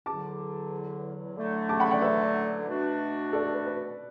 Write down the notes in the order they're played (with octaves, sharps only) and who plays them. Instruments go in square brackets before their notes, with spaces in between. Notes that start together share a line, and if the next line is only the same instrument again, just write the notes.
[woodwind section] E2 D3 F#3 [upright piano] A5 D6
[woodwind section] D3 F#3 A3 E4
[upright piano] A5 D6
F#5 B5
D5 F#5
B4 E5
[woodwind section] B2 A3 D4 F#4
[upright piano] A4 D5
A4
B4
B4